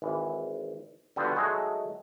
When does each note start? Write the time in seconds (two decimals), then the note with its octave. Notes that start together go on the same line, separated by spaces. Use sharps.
0.02 G#1 E3
1.16 D3 F3 G3 B3 F#4 C5
1.36 F#3 G#3 A3 D#4 F#4 G#4